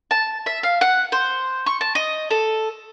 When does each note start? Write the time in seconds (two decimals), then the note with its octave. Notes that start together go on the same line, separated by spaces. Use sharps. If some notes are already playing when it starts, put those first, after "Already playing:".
0.11 A5
0.46 E5
0.63 F5
0.81 F#5
1.12 C5
1.66 C#6
1.81 A5
1.95 D#5
2.31 A4